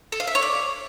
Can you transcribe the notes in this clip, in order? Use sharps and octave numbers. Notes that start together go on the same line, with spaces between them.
A4
F5
E5
C#5
D5